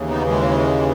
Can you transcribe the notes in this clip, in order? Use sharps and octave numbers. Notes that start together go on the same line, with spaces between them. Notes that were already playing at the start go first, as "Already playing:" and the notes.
Already playing: D#2 C#3 E3
B3 D#4
G#3